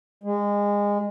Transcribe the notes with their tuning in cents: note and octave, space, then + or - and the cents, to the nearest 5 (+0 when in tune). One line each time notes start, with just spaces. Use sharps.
G#3 -25